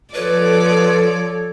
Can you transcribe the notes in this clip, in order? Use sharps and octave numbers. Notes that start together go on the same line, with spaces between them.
F3 A4 B4 C#5 D5